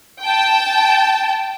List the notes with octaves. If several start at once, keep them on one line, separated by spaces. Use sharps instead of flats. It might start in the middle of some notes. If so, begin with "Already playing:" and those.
G5 A5